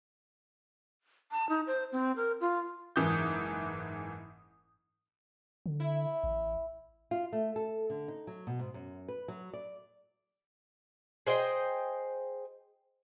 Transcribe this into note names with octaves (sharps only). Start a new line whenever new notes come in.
A5
D#4
C5
C4
A#4
F4
F#1 G#2 E3 D#6 G6
D3
E4
A1
F4
A3
A4
D3
D#4
F#3
B2
G#2
F#2
B4
F#3
D5
G#4 C5 D#5 G5